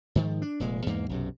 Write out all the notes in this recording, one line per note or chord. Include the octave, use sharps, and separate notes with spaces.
G#2 D#3 F3
D4
F1 A#2 G#3
E2 G#2 G#3 A#3
B1 F#2 C3